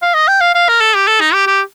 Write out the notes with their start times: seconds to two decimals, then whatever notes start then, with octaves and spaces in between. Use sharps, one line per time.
0.02 F5
0.14 D#5
0.28 G5
0.41 F5
0.55 F5
0.68 A#4
0.80 A4
0.95 G4
1.08 A4
1.21 D#4
1.34 G4
1.47 G4